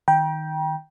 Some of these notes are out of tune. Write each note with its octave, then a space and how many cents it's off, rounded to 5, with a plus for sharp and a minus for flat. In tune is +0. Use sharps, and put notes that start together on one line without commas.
D#3 +0 G5 +0 A#5 +45